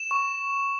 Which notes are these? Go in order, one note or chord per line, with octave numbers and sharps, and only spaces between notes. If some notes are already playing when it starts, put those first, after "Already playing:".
Already playing: E7
C#6